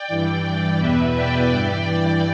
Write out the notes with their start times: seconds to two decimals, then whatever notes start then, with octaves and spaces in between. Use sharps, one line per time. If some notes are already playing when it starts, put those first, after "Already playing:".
Already playing: D5 G5
0.08 G2 E3
0.78 E2 B2 B4 E5
1.13 D5 G5
1.50 G2 E3